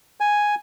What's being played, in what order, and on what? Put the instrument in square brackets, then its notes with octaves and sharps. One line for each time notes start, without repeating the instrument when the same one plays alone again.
[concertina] G#5